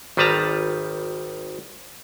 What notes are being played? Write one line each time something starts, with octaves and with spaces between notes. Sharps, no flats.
G#1 D#3 G3 B4 A5 A#5